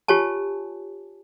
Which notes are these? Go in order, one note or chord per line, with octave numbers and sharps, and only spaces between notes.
F4 G4 C#5 G#5 A5